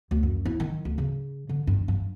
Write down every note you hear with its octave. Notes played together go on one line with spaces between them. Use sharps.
D2
F#2
E4
D#3
D2
C#3
D3
G2
G2